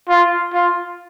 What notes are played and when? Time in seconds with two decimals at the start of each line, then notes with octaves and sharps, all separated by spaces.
0.09 F4
0.53 F4